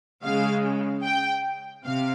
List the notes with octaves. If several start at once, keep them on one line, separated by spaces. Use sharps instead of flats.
C#3 G#3 F5
G5
C3 F5